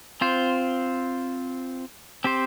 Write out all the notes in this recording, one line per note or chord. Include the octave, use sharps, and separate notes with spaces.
C4 F4 C5
C4 G4 C5